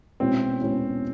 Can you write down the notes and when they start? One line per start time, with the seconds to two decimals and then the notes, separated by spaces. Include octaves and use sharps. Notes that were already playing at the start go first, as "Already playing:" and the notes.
0.20 B2 G#3 C4 C#4 E4
0.61 B2 G#3 C#4 E4